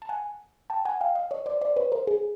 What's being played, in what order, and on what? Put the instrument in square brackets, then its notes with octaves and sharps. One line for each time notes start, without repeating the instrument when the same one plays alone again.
[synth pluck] A5
F#5 G#5
G5 A5
F#5 G#5
F5 G5
D#5 F5
C#5 D#5
C5 D5
C5 D5
B4 C#5
A#4 C5
G#4